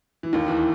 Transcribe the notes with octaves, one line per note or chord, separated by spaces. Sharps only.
E3
D#2 D#3
E2 E3